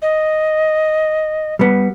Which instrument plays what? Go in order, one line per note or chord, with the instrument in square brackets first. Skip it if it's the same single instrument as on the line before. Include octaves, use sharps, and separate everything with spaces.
[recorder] D#5
[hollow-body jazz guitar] G3 B3